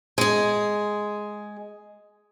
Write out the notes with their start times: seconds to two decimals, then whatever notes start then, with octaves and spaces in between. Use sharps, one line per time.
0.18 G#3 G#4